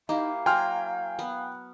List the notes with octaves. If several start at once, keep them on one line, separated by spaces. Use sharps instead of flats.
A#3 D#4 E4 G4 F5
F#3 A#3 G5 G#5 C6 F6
B3